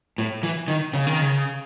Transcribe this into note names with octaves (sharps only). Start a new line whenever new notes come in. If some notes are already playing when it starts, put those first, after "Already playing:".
A2
E3
D#3
C#3
D#3
C#3